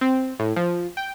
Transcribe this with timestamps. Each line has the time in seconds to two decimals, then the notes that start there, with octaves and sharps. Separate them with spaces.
0.01 C4
0.39 A2
0.56 F3
0.97 G5